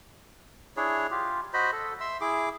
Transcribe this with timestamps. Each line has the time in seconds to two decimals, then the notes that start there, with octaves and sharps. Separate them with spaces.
0.77 D4 E4 G#4 C#5
1.11 F4 G4
1.54 F#4 C5 D#5 B5
1.72 A4
2.00 E5 C6 E6
2.21 E4 G#4 D6